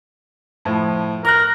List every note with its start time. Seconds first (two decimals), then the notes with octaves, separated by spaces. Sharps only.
0.65 A2 F3
1.25 A#4 F6 F#6